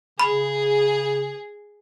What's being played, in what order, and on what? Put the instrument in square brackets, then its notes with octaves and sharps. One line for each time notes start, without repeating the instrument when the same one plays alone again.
[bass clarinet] C#3 [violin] G#4 [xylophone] B5